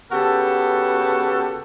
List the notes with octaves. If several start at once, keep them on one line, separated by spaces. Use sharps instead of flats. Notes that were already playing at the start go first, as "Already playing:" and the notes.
C#3 B3 F#4 G4 A4